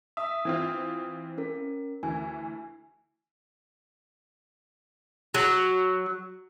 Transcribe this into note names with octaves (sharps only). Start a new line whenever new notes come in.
E5 D#6
E3 C4 F4
C#4 A#4
D2 E3 G#5
F#3